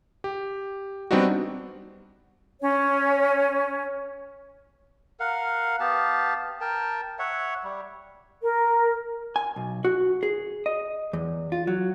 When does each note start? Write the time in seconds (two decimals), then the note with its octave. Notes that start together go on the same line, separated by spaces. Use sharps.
0.24 G4
1.11 G3 B3 C4 D4 D#4 F#4
2.61 C#4 C#5
5.20 A#4 F5 F#5
5.80 B3 G4 F5 A5
6.61 A#4 G5 A5
7.19 C#5 E5 F#5
7.64 G3
8.42 A#4
9.36 G#5
9.56 B1
9.85 F#4
10.23 G#4
10.66 D#5
11.13 E2
11.52 F4
11.67 F#3